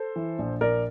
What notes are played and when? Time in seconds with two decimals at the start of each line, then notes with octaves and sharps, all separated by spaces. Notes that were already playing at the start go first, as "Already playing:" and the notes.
Already playing: A4 C5
0.16 E3
0.39 A#1
0.61 A#1 A#4 D5